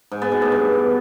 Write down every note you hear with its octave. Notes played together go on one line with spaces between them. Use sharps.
G#2
B3
B2
A2
G2